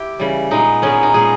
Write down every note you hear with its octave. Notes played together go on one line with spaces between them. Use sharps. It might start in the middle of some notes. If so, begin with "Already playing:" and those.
Already playing: E4 G4
C#3 E3 G3
A#2 G#3 B3 D#4
A#2 G#3 B3 C#4
D#4
A#2 G#3 B3 G#4